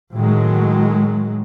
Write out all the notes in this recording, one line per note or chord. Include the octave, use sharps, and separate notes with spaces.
A2 D#3 F#3 G#3